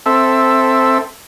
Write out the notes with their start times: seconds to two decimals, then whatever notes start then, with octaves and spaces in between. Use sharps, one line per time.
0.06 C4 A4 E5